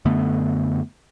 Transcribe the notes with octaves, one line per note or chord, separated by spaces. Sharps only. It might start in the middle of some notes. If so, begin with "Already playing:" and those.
F#2 D3 A3 B3